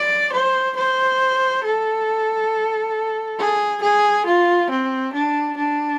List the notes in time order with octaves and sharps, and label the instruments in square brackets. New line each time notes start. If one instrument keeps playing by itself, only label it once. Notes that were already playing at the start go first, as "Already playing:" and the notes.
Already playing: [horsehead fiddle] D5
C5
C5
A4
G#4
G#4
F4
C4
D4
D4